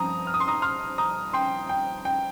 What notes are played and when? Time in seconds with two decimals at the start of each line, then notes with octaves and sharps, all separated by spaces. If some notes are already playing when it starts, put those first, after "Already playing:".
Already playing: G2 F3 C4 A#5 D#6
0.27 F6
0.34 D#6
0.40 C6
0.48 A#5 D#6
0.62 C6 F6
0.98 A#5 D#6
1.33 G5 C6
1.69 G5
2.05 G5